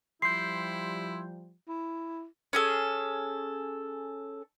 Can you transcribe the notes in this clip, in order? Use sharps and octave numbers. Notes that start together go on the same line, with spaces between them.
F3 G3 E4 C6 G6 C7
E4
C#4 G#4 A4